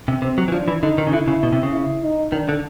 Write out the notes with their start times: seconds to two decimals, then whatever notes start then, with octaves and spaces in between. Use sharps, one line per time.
0.08 C3
0.22 C3 C4
0.38 F#3
0.48 E3
0.52 F3 D4
0.68 E3
0.83 D3 D#4
0.98 D#3
1.07 C#3
1.13 D3 E4
1.28 C#3
1.43 B2
1.53 C3
1.63 C#3
1.72 E4
2.03 D#4
2.32 D#3 D4
2.49 D3